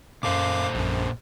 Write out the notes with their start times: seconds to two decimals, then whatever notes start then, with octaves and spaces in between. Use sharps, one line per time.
0.23 F#2 A#2 A4 C5 F5 D6
0.75 A#1 F#2